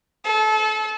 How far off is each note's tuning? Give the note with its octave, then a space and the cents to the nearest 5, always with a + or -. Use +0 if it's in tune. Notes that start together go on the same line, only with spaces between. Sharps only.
A4 -30